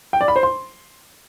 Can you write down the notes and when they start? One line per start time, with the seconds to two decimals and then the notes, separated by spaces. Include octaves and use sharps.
0.13 G5
0.21 D5
0.28 B5
0.36 C5
0.43 C6